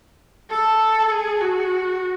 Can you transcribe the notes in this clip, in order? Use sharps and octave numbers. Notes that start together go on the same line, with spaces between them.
A4
G#4
F#4